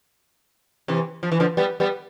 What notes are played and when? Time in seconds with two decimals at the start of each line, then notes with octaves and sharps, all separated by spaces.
0.88 C3 E3
1.23 F3
1.32 E3
1.40 D3 F3
1.57 G3 B3
1.80 G3 B3